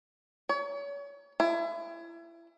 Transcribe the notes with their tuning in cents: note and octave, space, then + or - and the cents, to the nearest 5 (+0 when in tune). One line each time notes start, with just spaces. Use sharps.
C#5 +35
E4 +30